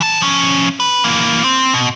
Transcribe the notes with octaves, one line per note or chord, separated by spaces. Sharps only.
E3 A5
F3 C#4
B4
E3 A#3
C4
B2